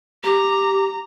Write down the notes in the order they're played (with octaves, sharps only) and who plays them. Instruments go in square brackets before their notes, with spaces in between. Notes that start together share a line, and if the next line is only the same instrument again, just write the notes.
[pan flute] G4 [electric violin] A#5